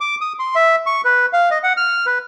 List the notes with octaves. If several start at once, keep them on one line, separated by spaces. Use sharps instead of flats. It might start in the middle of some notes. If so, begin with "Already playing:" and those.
D6
D#6
C6
E5
C#6
B4
F5
D#5
F#5
F6
B4